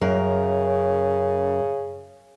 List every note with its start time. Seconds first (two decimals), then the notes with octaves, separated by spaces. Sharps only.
0.01 F#2 C#3 A#4